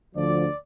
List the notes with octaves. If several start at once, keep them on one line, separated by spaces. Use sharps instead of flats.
D2 D3 F3 D5